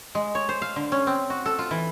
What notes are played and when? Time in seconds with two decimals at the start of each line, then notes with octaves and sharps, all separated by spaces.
0.15 G#3
0.35 C#5
0.49 C5
0.62 F5
0.76 D3
0.92 C#4
1.07 C4
1.30 F#4
1.46 A4
1.59 F4
1.71 E3